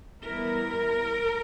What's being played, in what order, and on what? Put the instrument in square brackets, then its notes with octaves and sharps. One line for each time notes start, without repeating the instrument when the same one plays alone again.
[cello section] E3 G3 B3 E4 A#4